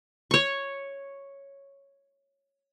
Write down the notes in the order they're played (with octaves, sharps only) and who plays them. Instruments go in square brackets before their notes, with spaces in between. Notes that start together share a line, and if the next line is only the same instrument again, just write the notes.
[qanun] C#5 C#6